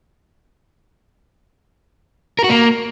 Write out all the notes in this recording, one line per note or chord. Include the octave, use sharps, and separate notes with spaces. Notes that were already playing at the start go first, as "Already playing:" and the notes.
A#4
F#4
A#3